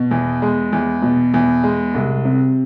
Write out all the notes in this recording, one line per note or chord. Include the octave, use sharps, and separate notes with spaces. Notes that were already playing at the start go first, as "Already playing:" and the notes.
Already playing: B2
E2
G#3
E2
B2
E2
G#3
C2
C3